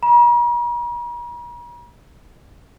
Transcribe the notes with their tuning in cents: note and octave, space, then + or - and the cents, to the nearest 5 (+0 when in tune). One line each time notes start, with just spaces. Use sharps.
A#5 +45